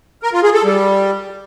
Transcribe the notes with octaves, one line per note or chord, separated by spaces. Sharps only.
A#4
F4
G#4
A4
G3